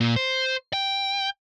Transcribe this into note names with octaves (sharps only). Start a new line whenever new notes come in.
A#2
C5
G5